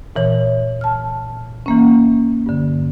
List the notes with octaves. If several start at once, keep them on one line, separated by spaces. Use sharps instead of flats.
A#2 E3 C#5
A5 F6
E3 A#3 C#4
G2 D3